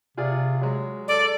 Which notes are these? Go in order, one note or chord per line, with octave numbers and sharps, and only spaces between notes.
C3 F4 G#4 D5
F#3 G#3
A4 D5